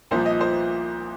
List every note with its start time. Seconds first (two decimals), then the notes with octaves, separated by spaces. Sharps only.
0.11 C2 A#2 F3 C5
0.26 D#5
0.41 C5